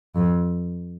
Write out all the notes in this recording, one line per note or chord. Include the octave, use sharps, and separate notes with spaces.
F2